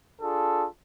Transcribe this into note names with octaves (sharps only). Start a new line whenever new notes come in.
D4 F4 G#4 A4